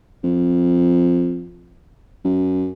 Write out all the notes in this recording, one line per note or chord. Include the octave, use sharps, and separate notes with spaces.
F2
F#2